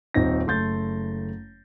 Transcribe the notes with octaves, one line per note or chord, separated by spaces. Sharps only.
D#1 C4 D#4 A#6
F#1 A3 C6 G6 A6